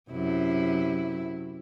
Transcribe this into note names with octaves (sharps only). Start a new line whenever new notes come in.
F#2 C3 E4